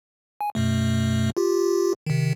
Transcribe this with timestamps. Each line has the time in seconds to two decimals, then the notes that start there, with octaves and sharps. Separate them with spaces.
0.41 G#5
0.55 F#2 B2 A3
1.37 F4 G4
2.06 C3 D#3